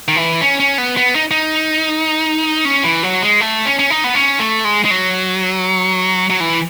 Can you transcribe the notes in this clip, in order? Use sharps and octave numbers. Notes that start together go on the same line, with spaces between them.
D#3
E3
C#4
C#4
B3
B3
D#4
D#4
C#4
E3
F#3
G#3
A3
C#4
C#4
D#4
B3
C#4
A3
G#3
G#3
F#3
F#3
E3